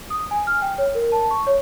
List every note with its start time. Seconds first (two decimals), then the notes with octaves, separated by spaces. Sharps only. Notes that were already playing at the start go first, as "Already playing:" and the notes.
0.10 D#6
0.31 G#5
0.47 F6
0.62 G5
0.78 C#5
0.95 A#4
1.12 A5
1.31 C#6
1.47 C#5